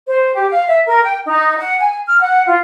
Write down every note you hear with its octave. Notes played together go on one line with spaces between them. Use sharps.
C5
G4
F5
E5
A#4
G5
D#4
F#5
G#5
F6
F#5
F4